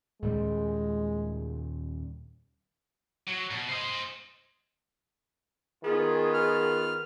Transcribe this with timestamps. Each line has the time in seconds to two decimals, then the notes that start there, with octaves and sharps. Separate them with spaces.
0.22 D#2 A#2 G3 G#3
3.28 F#3
3.51 B2
3.69 C5 D#5
5.84 D#3 B3 F4 G#4
6.34 F6